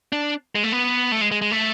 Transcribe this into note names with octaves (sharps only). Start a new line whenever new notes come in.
D4
G#3
A3
B3
A3
G#3
G#3
G#3
A3